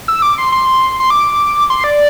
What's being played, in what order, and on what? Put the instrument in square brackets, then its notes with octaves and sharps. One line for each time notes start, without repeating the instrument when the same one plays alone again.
[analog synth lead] E6
D6
C6
C6
C6
D6
C6
D5